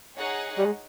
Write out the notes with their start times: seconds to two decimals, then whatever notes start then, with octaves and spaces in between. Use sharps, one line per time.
0.17 D#4 G#4 C#5 F#5
0.58 G3
0.66 G#3